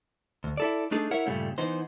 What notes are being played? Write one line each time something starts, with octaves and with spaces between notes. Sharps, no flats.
D2
E4 A4 D5
A3 D4 D#4 G#4 A4
E4 A#4 C#5 E5 F#5
G2 A#2 C#3 G3 A3
E3 B3 D#4 C5